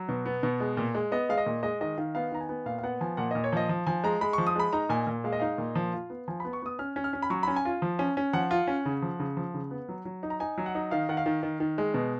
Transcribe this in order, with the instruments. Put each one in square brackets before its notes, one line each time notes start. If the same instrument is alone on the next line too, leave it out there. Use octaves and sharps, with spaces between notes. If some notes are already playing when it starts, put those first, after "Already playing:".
Already playing: [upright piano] F#3
B2
B3
B2
G#3
A#2
G#3
B3 D#5
G#3 F5
D#5
A#2
G#3 D#5
D#3 D#5
D#3 F5
B3 F5
D#3 A#5
G#5
B3
A#2 F5
F5
B3 F#5
F3 G#5
A#2 F#5
A#2 D#5
C#5
F3 D#5
F3
F3 G#5
G#3 A#5
G#3 B5
F3 C#6
D#6
G#3 B5
D#4 A#5
A#2 G#5
A#2
G#3 F5
D#5
D#4 F5
A#2
F3
F4
B3
F3 G#5
B3 B5
C#6
B3 D#6
C#4 F6
C#4
F6
C#4
B5
F#3 C#6
C#4 B5
G#5
F4
F3
C#4
C#4
F3 F#5
F4
C#4
C#3
F3
C#3
F3
C#3
B3
F#3
F#3
D#4
A#5
D#4 G#5
F#3
F#5
D#4
D#3 F5
D#3 F#5
F5
D#3
D#3
D#3
G#3
B2